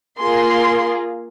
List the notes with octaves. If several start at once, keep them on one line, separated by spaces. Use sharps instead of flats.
A#3 F4 G#4 C6